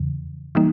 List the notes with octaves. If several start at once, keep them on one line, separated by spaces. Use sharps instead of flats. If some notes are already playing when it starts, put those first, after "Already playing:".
Already playing: E2 C#3 E3
E3 G3 A#3 D#4